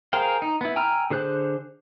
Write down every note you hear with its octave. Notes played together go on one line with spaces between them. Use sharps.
G#4 A#4 C5 F5 G5
D#4
B3 E4
G5 G#5 A#5 E6 F6
D3 G#4 C5 F#6 G6